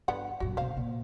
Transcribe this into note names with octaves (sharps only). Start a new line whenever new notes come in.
G1 D3 B3 F#5
A#1 F#2 F#4
B2 D3 C5 F5
A#2